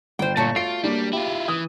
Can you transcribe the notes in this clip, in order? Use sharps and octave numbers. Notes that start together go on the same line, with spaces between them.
G1 C5 G5
A#2 A3 F#4 C#5
F4 C7 D7
G3 A#3 D4
E4 F4 G4
E3 D#6